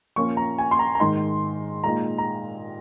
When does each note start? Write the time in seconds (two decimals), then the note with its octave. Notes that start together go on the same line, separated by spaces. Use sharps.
0.16 A#2 F3 A#3 C#4 C#6
0.37 A#5
0.58 G#5
0.71 C6
0.79 A#5
0.95 A#5
1.00 G#2 D#3 G#3 D#4 C6
1.84 A#2 G#3 D#4 A#5
2.18 A#5